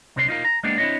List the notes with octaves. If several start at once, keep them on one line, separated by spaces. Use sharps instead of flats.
C2 C3 C4 D4 B4 C6
D#4 F4 A#4
A#5
G#3 A#3 B3 D4 G4
C4 D4 E4 C#5 D#5